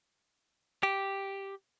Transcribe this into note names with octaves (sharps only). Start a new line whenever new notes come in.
G4